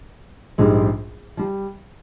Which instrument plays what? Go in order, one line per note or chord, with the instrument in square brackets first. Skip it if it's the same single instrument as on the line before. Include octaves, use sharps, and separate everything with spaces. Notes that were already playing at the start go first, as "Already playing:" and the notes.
[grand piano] A#1 G#2 G3 [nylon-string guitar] G#3
[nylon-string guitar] F3 [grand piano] G3